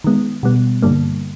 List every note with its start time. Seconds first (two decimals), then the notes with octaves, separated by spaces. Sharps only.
0.04 D#3 G#3 B3
0.43 B2 G3 B3
0.82 G2 D3 G3 A#3